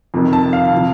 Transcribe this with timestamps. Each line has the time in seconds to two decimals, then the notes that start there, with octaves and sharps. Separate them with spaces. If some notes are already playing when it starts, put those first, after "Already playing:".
0.14 F2 C3 D#3
0.33 A5
0.53 F5
0.73 C3 F3